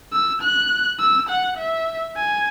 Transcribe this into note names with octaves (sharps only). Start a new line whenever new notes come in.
E6
F#6
E6
F#5
E5
G#5